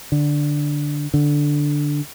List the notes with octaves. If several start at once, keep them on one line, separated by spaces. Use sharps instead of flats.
D3
D3